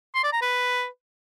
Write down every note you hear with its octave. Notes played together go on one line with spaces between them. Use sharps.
C6
D5
A#5
B4